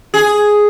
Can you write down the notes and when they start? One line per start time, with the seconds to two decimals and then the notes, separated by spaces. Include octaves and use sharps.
0.14 G#4